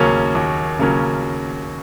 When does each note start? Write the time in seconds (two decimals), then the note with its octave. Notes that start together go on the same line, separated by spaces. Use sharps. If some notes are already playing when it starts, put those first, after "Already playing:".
Already playing: D#2 C#3 F#3 A#3 C#4
0.35 D#2
0.79 C#3 F#3 A#3 C#4